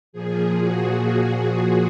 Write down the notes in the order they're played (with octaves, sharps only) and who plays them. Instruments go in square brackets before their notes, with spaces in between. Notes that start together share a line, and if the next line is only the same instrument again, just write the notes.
[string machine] A#2 F3 G#4
F#4